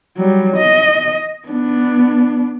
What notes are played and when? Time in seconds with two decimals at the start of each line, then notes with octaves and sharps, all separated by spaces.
0.17 F#3 G3
0.57 D#5
1.48 B3 D4